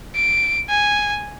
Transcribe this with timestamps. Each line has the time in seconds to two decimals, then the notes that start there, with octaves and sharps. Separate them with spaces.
0.15 D7
0.70 G#5